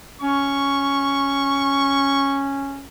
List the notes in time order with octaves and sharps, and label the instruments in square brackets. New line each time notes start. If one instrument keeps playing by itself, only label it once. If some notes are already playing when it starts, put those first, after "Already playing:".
[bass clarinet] C#4 [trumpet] C#6